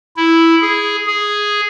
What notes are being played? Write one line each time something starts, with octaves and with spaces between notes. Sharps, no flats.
E4
G#4
G#4